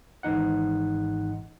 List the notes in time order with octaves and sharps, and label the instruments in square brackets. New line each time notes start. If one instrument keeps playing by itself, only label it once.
[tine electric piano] G#1 G#2 E3 D#4 F#5